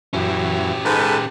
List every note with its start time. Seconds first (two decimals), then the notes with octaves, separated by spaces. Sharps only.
0.13 F#2 E3 C#4 G4
0.85 G#2 G#3 A4 B4